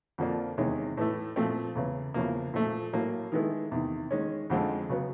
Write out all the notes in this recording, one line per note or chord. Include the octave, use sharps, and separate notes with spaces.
F2 D3 F3 A#3 D4
E2 C3 D#3 G#3 C#4
A2 E3 A3
A#2 F3 A3 C4
E2 C#3 E3
E2 C#3 F3 A#3
A#2 F3 A3
A2 F#3 A#3 C#4
D#3 G#3 B3 E4 A4
E2 C3 D#3
D#3 G#3 C#4
F2 D3 F3 G#3 C4
C#3 F#3 B3